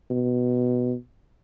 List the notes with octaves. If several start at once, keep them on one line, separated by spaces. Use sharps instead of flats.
B2